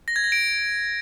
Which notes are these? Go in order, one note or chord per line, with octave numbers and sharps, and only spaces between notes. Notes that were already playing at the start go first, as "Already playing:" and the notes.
A#6
G#6
A#6
D7